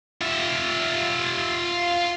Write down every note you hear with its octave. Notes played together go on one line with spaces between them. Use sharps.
F4 E5